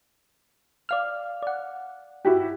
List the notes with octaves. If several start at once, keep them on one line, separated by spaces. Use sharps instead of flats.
D5 F5 F6
D5 F#5
E4 F#4 G4